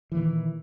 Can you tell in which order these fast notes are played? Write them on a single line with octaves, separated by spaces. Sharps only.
E3 A#2 D#3